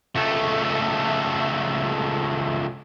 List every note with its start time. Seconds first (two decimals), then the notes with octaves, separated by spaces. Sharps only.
0.16 C#2 A3